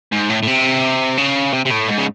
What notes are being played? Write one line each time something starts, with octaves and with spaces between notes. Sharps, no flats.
G#2
A2
A2
C3
C#3
C3
C3
A2
G#2
C#3